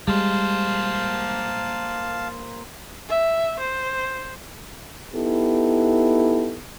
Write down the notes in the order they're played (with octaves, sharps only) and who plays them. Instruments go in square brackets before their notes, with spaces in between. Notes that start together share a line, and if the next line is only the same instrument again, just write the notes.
[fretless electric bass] G3 G#3 [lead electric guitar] A#3 C5 [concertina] F5 A5
[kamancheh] E5
C5
[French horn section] B3 D#4 E4 G4 A4